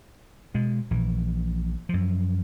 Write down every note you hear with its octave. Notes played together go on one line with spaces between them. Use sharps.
B2 G#3
A#1 E3
F#2 F3